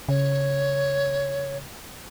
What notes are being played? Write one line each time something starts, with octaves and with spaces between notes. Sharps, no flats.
C#3 C#5